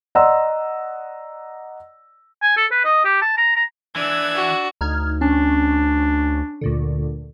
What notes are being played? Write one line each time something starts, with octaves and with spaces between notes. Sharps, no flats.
D5 D#5 F#5 A#5 C6 E6
G#5
A4
B4
D#5
G4
A5
A#5
A#5
E3 D4 E6 F#6 G#6
F#4
D2 D#4 F6 G#6
C#4 D4
D2 A#2 D3